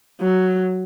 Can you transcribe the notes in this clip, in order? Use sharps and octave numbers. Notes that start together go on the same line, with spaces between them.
F#3